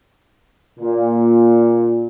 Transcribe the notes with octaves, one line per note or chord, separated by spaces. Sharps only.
A#2